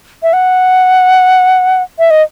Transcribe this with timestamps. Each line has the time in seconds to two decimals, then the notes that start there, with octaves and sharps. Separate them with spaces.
0.23 E5
0.33 F#5
1.99 E5
2.10 D#5